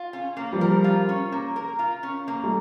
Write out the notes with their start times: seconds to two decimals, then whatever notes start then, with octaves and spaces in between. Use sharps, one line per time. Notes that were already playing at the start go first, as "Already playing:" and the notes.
Already playing: F4
0.13 C#4
0.37 A#3
0.52 F3 G3
0.61 A#4
0.84 F4
1.09 C#4
1.32 A#3
1.56 A#4
1.79 F4
2.03 C#4
2.28 A#3
2.43 G3 A3